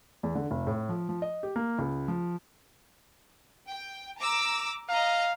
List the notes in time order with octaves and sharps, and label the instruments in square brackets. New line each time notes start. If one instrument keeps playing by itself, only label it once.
[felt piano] E2
D3
F1
A2
F3
F3
D#5
G4
A#3
C#2
F3
[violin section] G5
A#5 D6 E6
[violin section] D#5 A#5 [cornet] F5